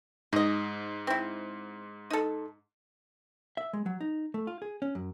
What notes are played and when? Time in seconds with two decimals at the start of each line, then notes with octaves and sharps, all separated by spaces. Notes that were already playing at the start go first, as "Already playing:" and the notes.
0.33 G#2 D#4 D#5
1.07 C4 E4
2.10 D#4 A4
3.57 E5
3.73 G#3
3.86 F#3
4.01 D#4
4.34 A3
4.47 F4
4.62 G#4
4.82 C#4
4.95 F#2